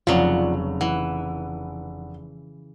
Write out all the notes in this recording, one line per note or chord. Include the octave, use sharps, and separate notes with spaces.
F1 C#3 F#3 F4 D5 F#5
E3 F#5